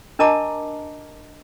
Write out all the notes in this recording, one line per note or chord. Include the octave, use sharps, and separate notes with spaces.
D4 A#4 D#5 A5 A#5 D6